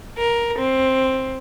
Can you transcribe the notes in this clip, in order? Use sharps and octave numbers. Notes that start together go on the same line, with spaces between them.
A#4
C4